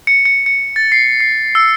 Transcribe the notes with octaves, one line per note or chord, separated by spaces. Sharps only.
C#7
C#7
C#7
A6
C7
C7
E6